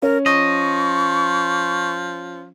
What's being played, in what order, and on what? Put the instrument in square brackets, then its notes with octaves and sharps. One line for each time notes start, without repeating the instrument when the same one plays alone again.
[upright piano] C#4 [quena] A#4
[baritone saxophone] F3 [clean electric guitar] D#5 [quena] C#6